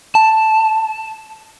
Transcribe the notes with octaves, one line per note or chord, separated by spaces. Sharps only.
A5